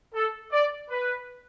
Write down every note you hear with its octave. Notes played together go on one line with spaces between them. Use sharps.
A4
D5
B4